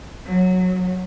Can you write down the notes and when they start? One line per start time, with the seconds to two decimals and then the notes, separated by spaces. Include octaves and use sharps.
0.24 F#3